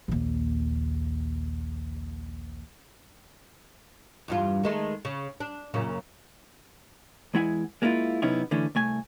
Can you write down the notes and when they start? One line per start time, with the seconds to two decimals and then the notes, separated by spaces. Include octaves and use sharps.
0.08 A#1 D#2
4.28 E2 G2 F4
4.63 D#3 G#3 A3
5.05 C#3
5.40 D4
5.74 F#2 A#2 C#3
7.34 E2 G#3 E4 F#5 G#5
7.82 G#3 A#3 C#4 E4 F4
8.22 C3 F#3 B3 C#4 D#4 E4
8.51 D3 E3 A3 C#4
8.75 C2 A3 G#5